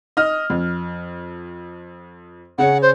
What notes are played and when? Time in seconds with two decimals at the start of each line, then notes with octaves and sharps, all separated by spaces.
0.17 D#5 D#6 F6
0.50 F2
2.58 C#3 C#4 F#5
2.82 C5